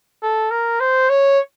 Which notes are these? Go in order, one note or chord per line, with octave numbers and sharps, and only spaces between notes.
A4
A#4
C5
C#5